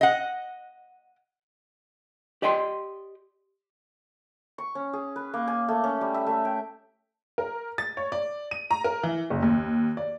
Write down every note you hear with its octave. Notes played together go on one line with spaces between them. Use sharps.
D#5 F#5
G4 D5 D#5 G5 B5 C6
C#6
C#4
G#4
B4
A#3
G#5
A3
C#4
G3
E5
A3
G5
A#4
A6
C#5
D5
D#7
A#5
A#4
E3
F#1
D#2
D5